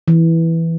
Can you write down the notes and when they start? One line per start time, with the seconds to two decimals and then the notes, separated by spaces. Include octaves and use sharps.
0.08 E3